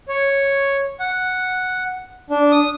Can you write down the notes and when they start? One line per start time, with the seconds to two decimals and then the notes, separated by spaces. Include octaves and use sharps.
0.08 C#5
1.00 F#5
2.30 D4
2.52 D#6